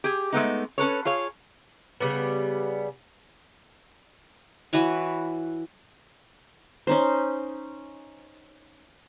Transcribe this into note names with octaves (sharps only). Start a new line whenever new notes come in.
G4 G#4
G#3 A3 B3 D#4
C#4 A4 B4 C#5
F4 G#4 C#5 F5
C#3 G3 B3
E3 F#4 B4 C#5
C#4 D#4 C5